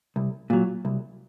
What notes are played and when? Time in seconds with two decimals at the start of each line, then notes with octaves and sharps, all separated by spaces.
0.16 C2
0.50 A#2 F#3
0.85 C2